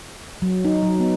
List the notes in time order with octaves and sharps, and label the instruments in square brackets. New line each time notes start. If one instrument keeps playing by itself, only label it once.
[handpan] F#3
D#4
F#3
B3